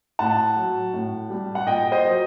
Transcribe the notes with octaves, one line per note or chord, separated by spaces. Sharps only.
A2 F#5 A5
F#3
A2
G3
F#5
A#2 D#5 G5
C5 D#5
F#3